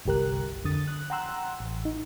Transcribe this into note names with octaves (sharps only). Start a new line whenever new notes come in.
G1 C2 G4 A#4 F#6
F2 D3 D#6 A6
F#6
F#5 G5 A#5 C6 E6 F#6
A1
D#4